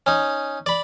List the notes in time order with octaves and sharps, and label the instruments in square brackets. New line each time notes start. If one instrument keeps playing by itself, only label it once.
[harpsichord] C#4 D#4
D5 B5